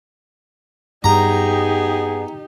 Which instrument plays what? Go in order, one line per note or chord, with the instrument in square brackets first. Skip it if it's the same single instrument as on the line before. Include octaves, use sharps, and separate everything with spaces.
[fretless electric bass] G2 [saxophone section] B3 G#4 [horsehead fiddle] D#4 G4 [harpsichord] A#5